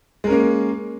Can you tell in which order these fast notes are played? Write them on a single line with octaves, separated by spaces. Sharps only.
G#3 A#4 C#4 A#3